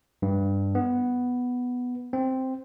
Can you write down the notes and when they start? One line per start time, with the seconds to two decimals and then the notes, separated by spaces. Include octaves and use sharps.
0.22 G2
0.75 B3
2.13 C4